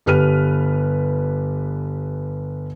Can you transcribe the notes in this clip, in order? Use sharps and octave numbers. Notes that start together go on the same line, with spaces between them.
G1 G4 B4 F6 D#7